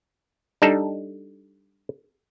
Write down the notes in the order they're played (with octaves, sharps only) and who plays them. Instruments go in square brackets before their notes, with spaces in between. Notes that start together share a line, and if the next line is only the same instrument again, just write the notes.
[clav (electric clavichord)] G3 D4 D#4 A4